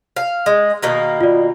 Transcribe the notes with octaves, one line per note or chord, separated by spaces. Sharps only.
F5
G#3
B2 D#3 A#3
F4 D5